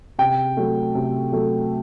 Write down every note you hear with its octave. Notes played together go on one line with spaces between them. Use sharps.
C3 G5
F#3 A3
C3
F#3 A3